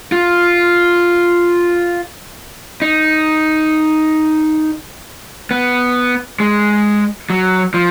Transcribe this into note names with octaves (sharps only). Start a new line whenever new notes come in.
F4
D#4
B3
G#3
F#3
F3